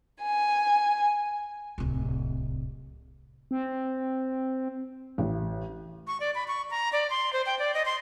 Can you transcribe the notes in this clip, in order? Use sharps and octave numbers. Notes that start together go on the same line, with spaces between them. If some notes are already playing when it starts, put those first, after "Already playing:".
G#5
D1 C2
C4
A1
C#6
D5
B5
C#6
A#5
D5
C6
C5
G5
D5
D#5
C6